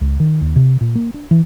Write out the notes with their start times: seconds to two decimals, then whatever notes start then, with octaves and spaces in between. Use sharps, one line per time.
0.01 C#2
0.20 D#3
0.41 D#2
0.56 C3
0.81 A#2
0.95 A#3
1.14 D4
1.31 E3